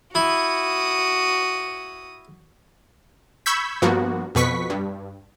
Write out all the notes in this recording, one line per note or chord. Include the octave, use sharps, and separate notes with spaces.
E4 F#4 D#6
B5 C#6 E6 G6 G#6 B6
G2 F3 A#3 B3 F#4
F2 B2 B4 C#6 B6
G2